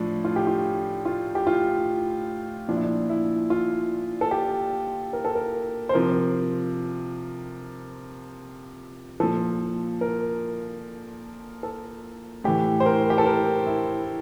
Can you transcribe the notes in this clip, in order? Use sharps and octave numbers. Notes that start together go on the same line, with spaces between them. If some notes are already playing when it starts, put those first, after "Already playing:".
Already playing: A2 F3 D4
F4
G4
F4
F4
G4
F4
A#2 F3 D4
E4
D4
E4
F4
A4
G4
A#4
A4
A#4
C5
C3 F3 A#4
A#2 F3 A4
A#4
A4
A2 E3 G4
C5
A#4
G4
A4
A#4
E4